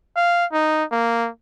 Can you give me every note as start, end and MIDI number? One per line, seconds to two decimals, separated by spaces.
0.16 0.45 77
0.52 0.84 63
0.92 1.29 58